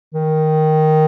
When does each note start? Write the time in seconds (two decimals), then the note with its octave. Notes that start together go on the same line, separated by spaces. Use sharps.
0.14 D#3